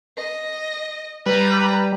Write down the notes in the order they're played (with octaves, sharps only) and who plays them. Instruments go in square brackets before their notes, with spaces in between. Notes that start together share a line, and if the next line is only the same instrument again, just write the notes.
[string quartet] D#5
[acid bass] G3 [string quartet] B4 A#5